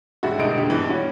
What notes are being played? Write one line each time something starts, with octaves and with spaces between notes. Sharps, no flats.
A1 G#2 G3 E4 F#4
E1 E2 D3 D#4 D#5 D7
E1 A#2 G4
G2 B2 E3
G3 C#4 F#4